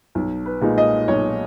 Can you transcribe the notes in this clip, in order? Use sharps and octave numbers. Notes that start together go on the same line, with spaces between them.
B1
B4
A#2 G#3 D#4
D#5
B1 C#5